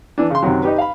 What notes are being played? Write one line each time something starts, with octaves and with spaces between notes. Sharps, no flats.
E3 D4
C#3 C6
F#2 C3 D#3 F#3
D#4 G4 B4
F5 B5